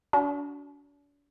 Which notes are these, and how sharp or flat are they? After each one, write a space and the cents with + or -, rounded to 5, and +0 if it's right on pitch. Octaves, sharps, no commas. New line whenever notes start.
D4 -40 F#4 +5